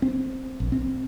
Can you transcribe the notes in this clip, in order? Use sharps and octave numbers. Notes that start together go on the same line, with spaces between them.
C4
A#1
C4